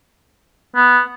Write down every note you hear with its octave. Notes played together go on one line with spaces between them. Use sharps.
B3